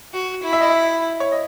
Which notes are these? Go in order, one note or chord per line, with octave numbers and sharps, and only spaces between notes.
F#4
E4
E5
D#5
E5
C#5
D#5